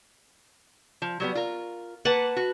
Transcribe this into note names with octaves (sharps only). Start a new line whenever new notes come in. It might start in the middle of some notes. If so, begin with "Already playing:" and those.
F3
F#3 G3 B3
F4 A#4
A#3 B4 F#5 A5
F#4